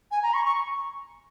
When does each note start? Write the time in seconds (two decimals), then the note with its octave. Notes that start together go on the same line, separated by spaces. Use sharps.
0.11 G#5
0.23 A#5
0.34 C#6
0.45 C#6